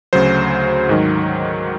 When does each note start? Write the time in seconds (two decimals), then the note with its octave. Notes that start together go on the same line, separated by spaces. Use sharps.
0.13 D2 C#3 F#3 C5
0.89 G#2 D#3 F#3